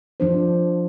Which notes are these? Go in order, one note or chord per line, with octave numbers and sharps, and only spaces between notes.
F3 D4 C5